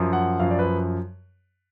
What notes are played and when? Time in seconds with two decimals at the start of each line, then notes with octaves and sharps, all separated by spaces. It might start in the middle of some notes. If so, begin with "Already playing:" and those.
Already playing: F#2 F3
0.13 F#5
0.40 F#2 F3 F5
0.51 D5
0.59 B4